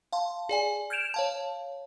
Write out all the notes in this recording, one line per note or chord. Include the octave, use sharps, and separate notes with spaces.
F5 A5 C6
G#4 D5 G#5
F6 G6 G#6 D7 E7 F7
C#5 F5 A5